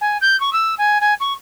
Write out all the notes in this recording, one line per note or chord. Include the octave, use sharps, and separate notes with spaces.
G#5
G6
C#6
E6
G#5
G#5
C#6